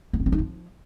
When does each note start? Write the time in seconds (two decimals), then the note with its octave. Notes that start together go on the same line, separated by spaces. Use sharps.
0.13 B3
0.20 C#4
0.26 C4
0.32 D#4
0.39 F3